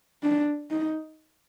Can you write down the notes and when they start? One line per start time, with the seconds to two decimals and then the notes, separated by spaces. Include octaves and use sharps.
0.23 D4
0.71 D#4